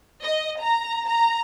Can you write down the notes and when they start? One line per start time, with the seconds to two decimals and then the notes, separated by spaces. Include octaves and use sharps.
0.23 D#5
0.62 A#5
1.08 A#5